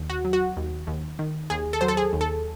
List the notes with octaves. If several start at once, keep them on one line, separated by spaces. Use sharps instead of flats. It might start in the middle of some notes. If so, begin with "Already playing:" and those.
Already playing: D#2
F#4
F#3
F#4
D#2
D#2
D#3
D#2 G#4
A4
F#3 C5
A4
G#4
D#2
A4